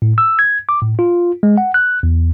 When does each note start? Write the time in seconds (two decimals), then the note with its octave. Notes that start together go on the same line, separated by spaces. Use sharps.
0.02 A2
0.18 E6
0.39 G#6
0.69 D6
0.82 A2
0.99 F4
1.43 G#3
1.58 F#5
1.74 F#6
2.03 E2